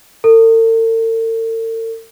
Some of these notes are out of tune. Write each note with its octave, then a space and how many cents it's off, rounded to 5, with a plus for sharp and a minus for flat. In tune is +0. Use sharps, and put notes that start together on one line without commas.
A4 +45